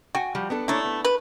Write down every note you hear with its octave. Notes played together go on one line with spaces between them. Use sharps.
F#4 G5 G#5
F3 G3
B3 D4 A4
A3 A#3 D4 E4 C#5
B3
B4